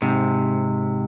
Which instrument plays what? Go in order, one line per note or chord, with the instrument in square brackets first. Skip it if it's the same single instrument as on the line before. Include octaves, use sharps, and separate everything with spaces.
[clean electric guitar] G#2 C3